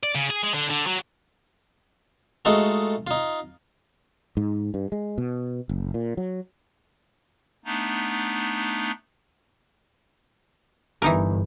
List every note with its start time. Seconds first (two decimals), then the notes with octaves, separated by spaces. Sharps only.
0.03 D5
0.15 C#3
0.30 G#4
0.43 G#3
0.54 D3
0.70 D3
0.87 F#3
2.45 G#3 A3 D#4 F4 F#4 A4
3.07 D#4 F4
4.37 G#2
4.74 G2
4.92 G#3
5.18 B2
5.69 F#1
5.94 A#2
6.17 F#3
7.65 A3 B3 D4 D#4
11.02 G1 E3 D#4 A#4